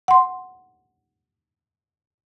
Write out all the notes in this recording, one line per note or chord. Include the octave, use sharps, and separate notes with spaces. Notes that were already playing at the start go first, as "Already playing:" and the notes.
F#5 C6